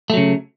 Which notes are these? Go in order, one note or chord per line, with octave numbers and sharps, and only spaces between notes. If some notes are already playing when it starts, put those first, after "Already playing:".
C#3 F#3 A3